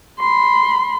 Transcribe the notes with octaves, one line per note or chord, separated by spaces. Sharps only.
B5 C6